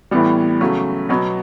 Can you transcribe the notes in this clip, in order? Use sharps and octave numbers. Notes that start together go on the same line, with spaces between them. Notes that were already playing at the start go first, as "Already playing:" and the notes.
A2 E3 G3 B3
C#3 F#3 A3
B2 F#3 B3